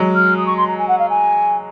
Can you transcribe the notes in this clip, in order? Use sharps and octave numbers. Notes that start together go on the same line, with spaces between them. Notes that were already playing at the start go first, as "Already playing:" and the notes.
Already playing: F#3 G#3
F6
D#6
C#6
C6
A#5
G#5
F#5
F5
G#5